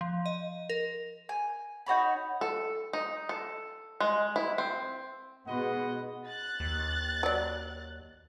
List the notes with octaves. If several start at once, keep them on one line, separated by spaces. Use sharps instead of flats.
F3
D#5
A#4
G#5
D#4 F#4 C#5 B5
A4
D#4
A4
G#3
E4
C4
G#2 B2 B4 D#5 F#5 C6
F#6 A6
D#2
F#3 D5